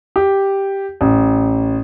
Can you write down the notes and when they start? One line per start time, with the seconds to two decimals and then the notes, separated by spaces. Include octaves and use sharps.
0.16 G4
1.01 A1